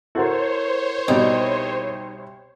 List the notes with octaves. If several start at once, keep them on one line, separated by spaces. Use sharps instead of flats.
E4 F#4 A4 A#4 C5 C#5
C2 B2 D#4 D5